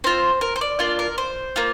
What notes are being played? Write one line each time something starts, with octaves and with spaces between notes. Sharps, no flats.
C4 F4 C5
A#4
C5
D5
A#3 D4 F4 D5
A#4
C5
A#3 F4